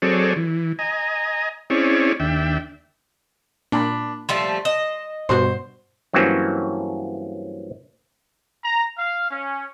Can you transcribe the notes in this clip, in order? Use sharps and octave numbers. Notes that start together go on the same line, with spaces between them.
F#3 C4 G#4 A4 C#5 D5
E3
D#5 G#5 A#5
C4 C#4 E4 G#4 C#5 D5
D#2 D4 E5 G5
A#2 D4 B5
F3 G3 A3 C6
D#5 E7
G2 B2 F#4 C5
G2 E3 F#3 A#3 C4 C#4
A#5
F5
C#4